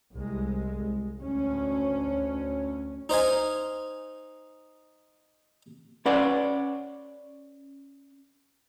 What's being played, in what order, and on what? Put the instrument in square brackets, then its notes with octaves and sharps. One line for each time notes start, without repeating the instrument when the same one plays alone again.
[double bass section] C2 G#3
D2 C#4
[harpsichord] D#4 C5 F5 G#5
[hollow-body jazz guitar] C#4 B4 D5 F#5